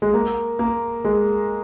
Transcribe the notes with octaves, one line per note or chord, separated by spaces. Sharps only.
G#3
A#3
A#3
G#3